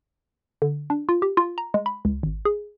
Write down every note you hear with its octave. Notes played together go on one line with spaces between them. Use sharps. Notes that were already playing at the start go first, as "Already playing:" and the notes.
D3
D4
F4
G4
F4
A#5
G#3
B5
C#2
G#1
G#4